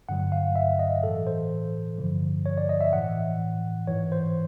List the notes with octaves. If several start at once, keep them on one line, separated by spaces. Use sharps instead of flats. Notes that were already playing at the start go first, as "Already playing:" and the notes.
G2 D3 F#3 F#5
F5
E5
D#5
A2 E3 A4
C5
G2 D3 F3
C#5
D5
D#5
E5
A2 E3 F#5
G#2 E3 C#5
C5